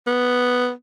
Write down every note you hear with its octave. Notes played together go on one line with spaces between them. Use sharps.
B3